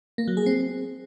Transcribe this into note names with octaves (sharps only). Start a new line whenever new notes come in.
A#3
F#3
G#4
C4